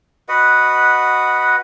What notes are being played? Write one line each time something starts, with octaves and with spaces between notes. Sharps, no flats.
F#4 B4 D#5 F#5